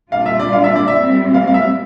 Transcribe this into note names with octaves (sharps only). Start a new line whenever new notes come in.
A#2 G3 D4 F4 F5
E5
D5
F5
E5
D5
E5
A#2 G3 C4
F5
F5
E5